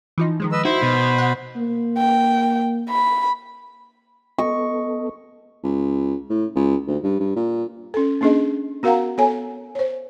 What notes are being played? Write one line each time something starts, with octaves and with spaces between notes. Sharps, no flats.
E3 F3 D#4
D#3 F3 G#3
B4 D#5 E6
D#4 E4 F#4 C5 B5
B2 D#4
F#5
A#3
G5
B5
B3 A4 D#5 C#6
C#2
A2
C#2
D2
G2
G2
A#2
C#4 A4
A#3 C#4 D4 G#4 D#5
B3 F#4 A#4 F5 F#5 A#5
B3 A4 C#5 G#5
C5 C#5